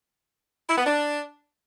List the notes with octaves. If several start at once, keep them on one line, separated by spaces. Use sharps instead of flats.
E4
B3
D4